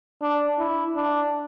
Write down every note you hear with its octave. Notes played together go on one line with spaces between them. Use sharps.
D4
E4
D4